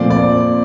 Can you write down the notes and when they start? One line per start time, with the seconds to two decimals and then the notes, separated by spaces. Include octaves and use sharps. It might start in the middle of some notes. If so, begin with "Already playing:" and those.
Already playing: A#2 F3 A3 C4 D5
0.10 D5